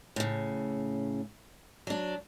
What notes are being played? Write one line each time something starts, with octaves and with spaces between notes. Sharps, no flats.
A2 C#3
F#3 D4